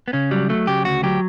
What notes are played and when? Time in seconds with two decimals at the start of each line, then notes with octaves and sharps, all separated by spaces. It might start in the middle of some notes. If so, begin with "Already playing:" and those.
0.08 B3
0.13 C#3 C#4
0.31 F#3 G3
0.49 F#3 A3
0.67 C#3 G4
0.85 D2 F#4
1.03 F#3 G4